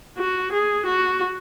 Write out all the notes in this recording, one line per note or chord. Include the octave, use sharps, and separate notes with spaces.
F#4
G#4
F#4